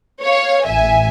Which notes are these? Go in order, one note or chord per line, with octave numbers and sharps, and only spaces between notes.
C#5 F5
A1 E5 G#5